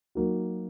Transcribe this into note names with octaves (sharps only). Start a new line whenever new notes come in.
F#3 A#3 D#4 F#4